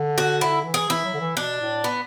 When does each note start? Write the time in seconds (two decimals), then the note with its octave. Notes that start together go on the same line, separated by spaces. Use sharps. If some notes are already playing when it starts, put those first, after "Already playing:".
Already playing: D3
0.18 F#4
0.41 D3 E4
0.65 E3
0.74 G#4
0.89 E3 E4
1.05 F#3
1.14 D3
1.21 E3
1.36 B2 D4
1.61 A2
1.84 B3